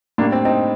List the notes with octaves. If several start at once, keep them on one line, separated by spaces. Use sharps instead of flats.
A2 G3 A#3 D4
C4
C4 D#4